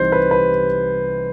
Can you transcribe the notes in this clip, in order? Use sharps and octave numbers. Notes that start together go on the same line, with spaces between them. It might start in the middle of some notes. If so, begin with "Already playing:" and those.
Already playing: C2 C3 E3 G3 D#4 C5
B4
B4